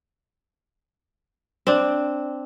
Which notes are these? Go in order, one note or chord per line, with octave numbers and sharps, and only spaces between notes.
C4 D4